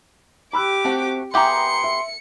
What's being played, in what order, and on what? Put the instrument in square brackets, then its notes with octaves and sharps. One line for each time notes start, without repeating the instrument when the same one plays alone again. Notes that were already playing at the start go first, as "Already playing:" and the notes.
[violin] G4 D6 [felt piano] B5 E6 F#6
[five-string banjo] A3 F#4 [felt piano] C4
[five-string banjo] B3 G4 G#4 [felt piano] E5 G5 A#5 [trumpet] C6 [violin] C#7
[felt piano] E5